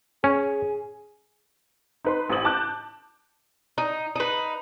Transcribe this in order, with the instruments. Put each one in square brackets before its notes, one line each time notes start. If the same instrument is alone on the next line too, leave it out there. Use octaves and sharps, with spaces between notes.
[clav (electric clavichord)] C#4 [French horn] G#4
[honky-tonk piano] D#4 B4 C6
A1 C5 D#6 F#7
A5 D6 F#6 G6
[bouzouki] D#4
D#4 B4